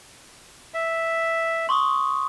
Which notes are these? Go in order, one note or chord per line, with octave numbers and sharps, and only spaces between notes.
E5
C6 C#6 D#6